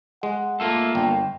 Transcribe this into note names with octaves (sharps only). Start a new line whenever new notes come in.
G#3 F#5
A3 A#3 F4 A4
G1 G5